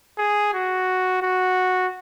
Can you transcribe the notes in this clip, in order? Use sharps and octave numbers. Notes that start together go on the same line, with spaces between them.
G#4
F#4
F#4